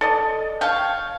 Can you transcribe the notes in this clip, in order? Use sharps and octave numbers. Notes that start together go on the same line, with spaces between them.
A4 D5 D#5
C#5 F5 G5 A5